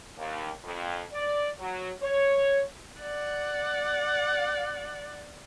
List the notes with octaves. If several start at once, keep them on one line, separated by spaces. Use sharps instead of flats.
D#2
F2
D5
F#3
C#5
D5 F#5